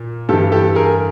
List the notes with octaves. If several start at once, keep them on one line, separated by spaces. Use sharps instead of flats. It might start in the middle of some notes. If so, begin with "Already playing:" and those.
Already playing: A#2
G2 E3 G4 A4
G4 A4
G#4 A#4